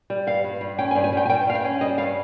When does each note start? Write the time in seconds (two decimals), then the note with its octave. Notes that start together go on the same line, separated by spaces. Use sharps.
0.10 G3
0.27 G2 F5
0.44 G2
0.61 G2
0.78 C#4 G5
0.91 G#5
0.95 G2
1.04 G#5
1.13 G2 G5
1.25 G#5
1.30 G2 G5
1.47 G2 F5
1.55 G5
1.64 C#4
1.81 G3 D#5
1.98 G2 F5